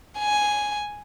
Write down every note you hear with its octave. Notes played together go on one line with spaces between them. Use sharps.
G#5